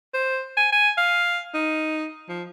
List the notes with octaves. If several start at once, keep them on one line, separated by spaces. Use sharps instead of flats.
C5
G#5
G#5
F5
D#4
F3